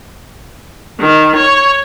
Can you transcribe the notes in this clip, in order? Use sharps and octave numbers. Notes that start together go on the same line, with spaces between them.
D#3
C#5